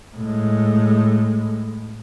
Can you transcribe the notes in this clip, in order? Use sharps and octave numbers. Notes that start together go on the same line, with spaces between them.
A2 G#3